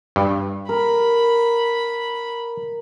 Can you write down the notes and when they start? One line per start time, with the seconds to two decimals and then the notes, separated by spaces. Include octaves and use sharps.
0.16 G2
0.69 A#4 B5